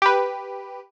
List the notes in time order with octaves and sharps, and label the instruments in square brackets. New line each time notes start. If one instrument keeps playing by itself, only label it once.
[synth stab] G4 B4